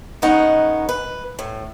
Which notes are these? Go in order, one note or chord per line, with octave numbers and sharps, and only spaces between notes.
D#3 G#3 B3 C#4 D#4 F#5
B4
A2